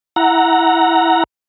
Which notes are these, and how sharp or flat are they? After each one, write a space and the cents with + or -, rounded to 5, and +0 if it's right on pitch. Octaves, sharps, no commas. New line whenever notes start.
E4 +0 F#5 +0 A#5 +0